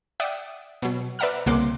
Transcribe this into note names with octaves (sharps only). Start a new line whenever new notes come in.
D5 E5 F#5 G5 D#6
B2 F#3
B4 D5 E5 F#5 A#5 F6
C2 C#3 A#3 F#5 C6 D6